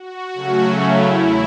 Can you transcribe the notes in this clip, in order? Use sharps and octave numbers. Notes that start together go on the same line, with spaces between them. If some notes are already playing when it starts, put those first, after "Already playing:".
Already playing: F#4
C#3 F#3 A3 C#4
E4
E2